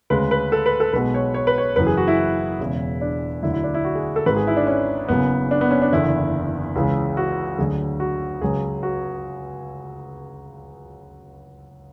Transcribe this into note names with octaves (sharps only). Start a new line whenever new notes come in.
D2 C#3 G#3 B4
B4
A4
B4
A4
B1 B2 G#3 B4
C#5
C#5
B4
C#5
F#1 F#2 E3 B4
G#4
F#4
E4
E1 E2 C#3 G#3
D4
D2 D3 F#3 E4
E4
D4
E4
F#4
G#4
A4
G#1 G#2 G#3 B4
G#4
E4
D4
C#4
F#1 F#2 C#3 B3
D4
B3
C#4
D4
F#1 E2 D3 E4
C#2 C#3 E3 G#3
F#4
D2 D3 F#3 G#4
F#4
C#2 C#3 F#3 G#4
F#4